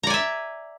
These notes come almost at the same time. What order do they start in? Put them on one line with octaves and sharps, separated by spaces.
A#5 D5 G#5 E5